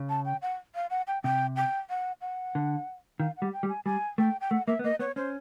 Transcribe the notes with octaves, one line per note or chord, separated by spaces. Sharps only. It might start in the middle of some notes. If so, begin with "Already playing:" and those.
Already playing: C#3
A5
G5
F#5
F5
F#5
G5
C3 G5
G5
F#5
F#5
D3
D#3 F5
F#5
G3
G5
G3
G#5
G3 G#5
A3 G5
G5
A3 F#5
A#3 E5
B3
A#3 D#5
B3 C#5
C#4 C5